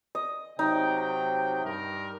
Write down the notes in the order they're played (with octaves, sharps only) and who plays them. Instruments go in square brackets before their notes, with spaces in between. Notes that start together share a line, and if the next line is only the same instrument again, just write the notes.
[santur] D#5
[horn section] C3 F#3 G5 [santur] D#4
[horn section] G2 A#4